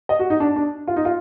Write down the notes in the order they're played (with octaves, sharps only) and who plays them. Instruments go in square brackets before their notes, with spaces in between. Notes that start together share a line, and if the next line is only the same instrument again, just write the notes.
[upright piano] D#5
F#4
D#4
D4
D4
F4
D#4
F4